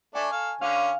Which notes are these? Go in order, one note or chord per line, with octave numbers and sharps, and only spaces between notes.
A3 D4 G#5 C#6
A4 F5
D3 C#4 F5